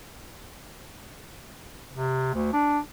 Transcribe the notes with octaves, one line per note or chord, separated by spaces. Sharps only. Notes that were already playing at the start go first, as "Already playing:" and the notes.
C3
D2
D4